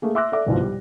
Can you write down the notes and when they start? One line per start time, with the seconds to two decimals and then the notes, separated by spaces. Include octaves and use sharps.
0.02 A3 A#3 G#4
0.15 E5 C6 D6 E6 F#6 A#6
0.32 A4 D5 E5 D6
0.47 G1 C2 G#2 B2 F3
0.61 G3